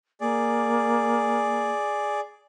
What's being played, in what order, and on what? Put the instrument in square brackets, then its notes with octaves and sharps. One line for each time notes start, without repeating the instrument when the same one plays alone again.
[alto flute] A#3 [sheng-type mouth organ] G#4 D5